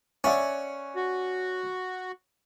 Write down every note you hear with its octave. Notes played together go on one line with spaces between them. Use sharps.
C#4 D5 E5 F#5
F#4